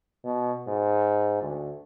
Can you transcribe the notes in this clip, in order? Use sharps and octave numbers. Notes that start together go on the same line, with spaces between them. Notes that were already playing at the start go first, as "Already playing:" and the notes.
B2
G#2
D2